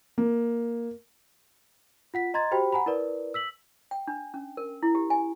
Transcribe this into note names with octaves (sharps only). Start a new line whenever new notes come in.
A#3
F4 F#5 B6
D#5 A#5 C6 G#6 A6
F#4 G4 C5 G5 B5
F#5 G#5 A#5 B5
E4 A#4 B4 D5
E6 B6 F#7
G5
D4
C#4
A#4
E4
G4
G#5